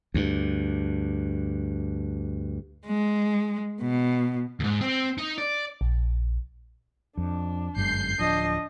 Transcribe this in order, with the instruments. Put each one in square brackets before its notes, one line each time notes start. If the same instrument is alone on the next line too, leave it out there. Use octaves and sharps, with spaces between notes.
[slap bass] D2 G2
[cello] G#3
B2
[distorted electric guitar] D#2 G#2
C4
D#4
D5
[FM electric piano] A#1
[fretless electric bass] F2 [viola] D4
[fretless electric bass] G1 F#2 G#3 [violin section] G6 C7
[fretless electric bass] D1 F3 [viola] D4 D#5